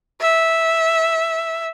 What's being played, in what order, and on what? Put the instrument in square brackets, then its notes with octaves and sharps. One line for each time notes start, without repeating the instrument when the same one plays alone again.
[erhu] E5